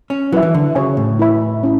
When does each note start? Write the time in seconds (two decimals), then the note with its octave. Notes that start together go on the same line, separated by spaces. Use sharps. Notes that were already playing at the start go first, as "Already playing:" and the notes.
0.10 C#4
0.32 F#3 E4 B4 E5
0.43 E3
0.54 D3
0.75 C#3 F#4 C#5 G#5
0.97 A2
1.19 E4 B4 E5 B5
1.63 C#4 E4